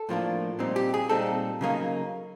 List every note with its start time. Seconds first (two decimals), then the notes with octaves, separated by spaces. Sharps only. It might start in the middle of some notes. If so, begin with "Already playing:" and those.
Already playing: A4
0.09 A2 F3 A#3 D4
0.59 A#2 G3 C4 D#4
0.76 G4
0.94 G#4
1.09 A#2 G3 C4 D#4 A4
1.61 C#3 F#3 A#3 D#4